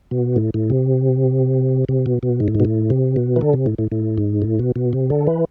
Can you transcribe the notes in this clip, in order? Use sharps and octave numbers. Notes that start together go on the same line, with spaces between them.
B2
A2
A2
C3
C3
B2
B2
G#2
A2
G#2
B2
A2
C3
B2
E3
D3
C3
A2
A2
A2
G#2
A2
B2
B2
C3
D3
E3